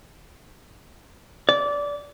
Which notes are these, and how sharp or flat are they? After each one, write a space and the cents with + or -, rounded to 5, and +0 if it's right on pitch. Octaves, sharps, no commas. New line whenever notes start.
D5 -20